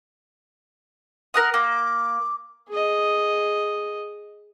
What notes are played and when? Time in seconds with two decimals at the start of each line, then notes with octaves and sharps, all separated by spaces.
1.34 A#4 F#5 D#6
1.54 A#3 D6
2.69 G#4 D#5